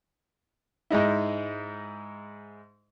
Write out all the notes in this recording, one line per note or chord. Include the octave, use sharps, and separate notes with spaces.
G#2 G#3 D#4 E4